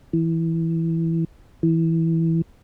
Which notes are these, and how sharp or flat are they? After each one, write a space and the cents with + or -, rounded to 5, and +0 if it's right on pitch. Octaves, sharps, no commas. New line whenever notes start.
E3 -5
E3 -10